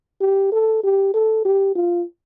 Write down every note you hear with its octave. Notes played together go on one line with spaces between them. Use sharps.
G4
A4
G4
A4
G4
F4